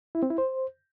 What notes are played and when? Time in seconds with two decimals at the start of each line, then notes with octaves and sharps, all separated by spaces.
0.15 E4
0.23 C4
0.30 E4
0.38 C5